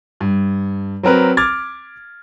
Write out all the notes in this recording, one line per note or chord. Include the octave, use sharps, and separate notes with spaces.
G2
F#3 C4 A#4 B4
D6 F6 G#6 A6